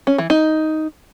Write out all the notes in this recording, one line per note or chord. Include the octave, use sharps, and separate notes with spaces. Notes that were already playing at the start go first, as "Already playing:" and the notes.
C#4
E3
D#4